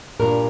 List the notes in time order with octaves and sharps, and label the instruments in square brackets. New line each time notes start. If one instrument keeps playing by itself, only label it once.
[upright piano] G2 A#2 [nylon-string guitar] A#4